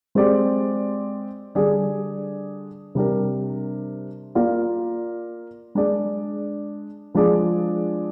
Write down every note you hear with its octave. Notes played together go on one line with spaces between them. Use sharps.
G#3 C4 G4 D5
D3 G3 D4 G#4 D5
C3 G3 D4 G4 A#4
A#3 F4 A#4 D5
G#3 D4 G#4 D5
F3 G#3 D4 G#4 D5